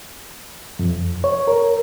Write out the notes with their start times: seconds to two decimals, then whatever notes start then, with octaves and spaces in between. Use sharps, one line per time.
0.79 F2
1.24 C#5
1.48 A#4